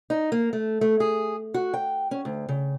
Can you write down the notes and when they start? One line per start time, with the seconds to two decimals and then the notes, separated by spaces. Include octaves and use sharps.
0.10 D#4
0.32 A#3
0.53 A3
0.81 A3
1.00 G#4
1.54 F#4
1.74 G5
2.11 C#4
2.25 D2
2.49 C#3